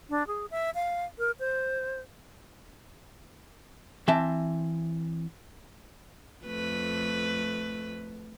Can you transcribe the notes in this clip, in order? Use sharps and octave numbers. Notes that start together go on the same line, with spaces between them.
D4
G#4
E5
F5
A#4
C5
E3 C4 E5 A5
F2 A3 B4